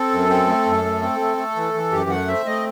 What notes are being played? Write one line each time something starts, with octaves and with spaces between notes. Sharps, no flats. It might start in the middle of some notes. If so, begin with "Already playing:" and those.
Already playing: C4 A4
F#2
C4
A3
F#2
A3
C4
A3
A3
E3
E3
F#2 G4
A3 F#5
C4 E5
A3 D#5